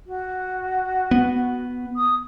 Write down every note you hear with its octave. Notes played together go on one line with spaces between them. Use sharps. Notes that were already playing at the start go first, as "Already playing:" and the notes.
F#4
B3
D#6